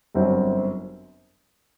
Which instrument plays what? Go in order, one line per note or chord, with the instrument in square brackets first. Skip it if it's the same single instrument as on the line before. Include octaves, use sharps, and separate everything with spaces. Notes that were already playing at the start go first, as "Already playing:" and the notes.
[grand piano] G1 F#2 F#3 C4